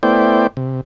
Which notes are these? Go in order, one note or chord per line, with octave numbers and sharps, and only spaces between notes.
A3 B3 E4 C5 D5 G5
C3